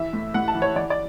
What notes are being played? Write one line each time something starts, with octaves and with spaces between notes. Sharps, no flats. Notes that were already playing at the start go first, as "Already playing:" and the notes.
Already playing: E3 E5
A2
A2 F#5
A5
E3
C#5
E3 D5
D5